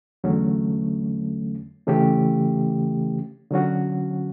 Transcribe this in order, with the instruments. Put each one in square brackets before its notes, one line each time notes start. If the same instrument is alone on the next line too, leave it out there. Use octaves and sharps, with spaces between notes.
[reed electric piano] E2 D3 F#3 A3 C#4
C#3 E3 A3 C#4 G4
D3 F#3 C#4 F#4